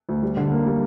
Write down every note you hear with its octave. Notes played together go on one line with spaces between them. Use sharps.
D2
G3
D3
A#3
G3